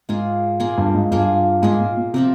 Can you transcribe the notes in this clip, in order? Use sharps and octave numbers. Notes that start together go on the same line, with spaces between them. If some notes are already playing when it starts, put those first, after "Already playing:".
G#2 A#3 F4 G#4
A#2 A#3 F4 G#4
G2
G#2
G2 A#3 F4 G#4
G#2 A#3 F4 G#4
A#2
A#2
C3 F3 C4 G4 A#4